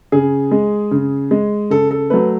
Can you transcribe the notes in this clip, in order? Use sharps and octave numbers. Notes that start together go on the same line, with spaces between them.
C#3 G#4
G#3
C#3
G#3
C#3 A4
A4
F#3 A3 B4